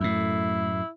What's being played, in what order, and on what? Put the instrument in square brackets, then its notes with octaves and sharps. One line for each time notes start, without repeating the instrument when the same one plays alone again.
[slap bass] F#2 A2 [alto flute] A3 [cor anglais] E4